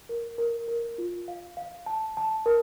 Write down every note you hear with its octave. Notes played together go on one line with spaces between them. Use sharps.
A#4
A#4
A#4
F4
F5
F5
A5
A5
A#4